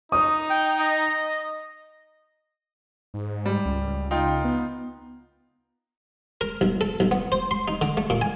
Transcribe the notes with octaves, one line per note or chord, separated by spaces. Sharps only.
D#4 D#6
G5
D#5
G#2
G3
C#2
D#4 F4 G5
B3
A#4
B1
A4
B1
B3
C5
C6
D#4
D3
A3
A#2
G#5